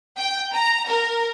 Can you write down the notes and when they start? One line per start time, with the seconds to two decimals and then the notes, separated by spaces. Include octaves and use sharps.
0.18 G5
0.53 A#5
0.88 A#4